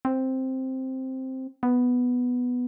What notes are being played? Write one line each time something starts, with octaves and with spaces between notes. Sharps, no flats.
C4
B3